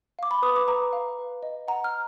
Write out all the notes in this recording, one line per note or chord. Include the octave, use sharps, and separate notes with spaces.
F5 D6
B5
B4 D#6
D6
B4 A#5
F5
B4
D#5
F#5 A#5
F6